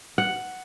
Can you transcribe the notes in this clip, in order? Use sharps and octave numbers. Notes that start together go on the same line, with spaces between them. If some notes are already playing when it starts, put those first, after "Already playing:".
F#5